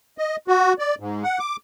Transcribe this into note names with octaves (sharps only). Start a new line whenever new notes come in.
D#5
F#4
D5
G#2
F#5
D6